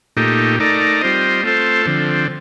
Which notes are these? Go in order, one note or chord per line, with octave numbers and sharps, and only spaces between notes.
A#2 A3 D#4 G4
A3 D#4 A#4 D5
G3 C4 F4 C5 D#5
A3 C4 F4 A4 C5
D3 F3 C4